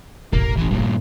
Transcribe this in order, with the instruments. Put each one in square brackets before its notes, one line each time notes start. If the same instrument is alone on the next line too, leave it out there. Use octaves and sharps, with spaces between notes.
[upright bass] E1 A1 [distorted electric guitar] A#3
[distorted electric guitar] E3 C#4
G2 A#2